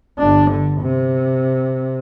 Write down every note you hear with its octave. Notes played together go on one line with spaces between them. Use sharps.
G1 D4
D3
C3